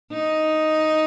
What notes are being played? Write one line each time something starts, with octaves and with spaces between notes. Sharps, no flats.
D#4